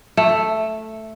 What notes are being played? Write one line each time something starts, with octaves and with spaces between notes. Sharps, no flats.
A3